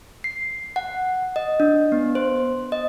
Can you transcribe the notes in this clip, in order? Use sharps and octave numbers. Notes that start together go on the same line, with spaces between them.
C7
F#5
D#5
D4
B3
C5
D#5